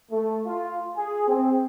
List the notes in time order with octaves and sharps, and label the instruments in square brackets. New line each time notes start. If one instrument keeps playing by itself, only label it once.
[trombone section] A3
F4
G#4
C4